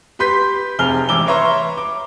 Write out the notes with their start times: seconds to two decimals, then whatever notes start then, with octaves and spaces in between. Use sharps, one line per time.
0.19 G4 B4 C6 G6 B6
0.79 F1 C3 G#4 F6 G7
1.09 A1 D6 E6 G7
1.27 B4 C#5 E5 A#5 C6 C#6
1.77 D6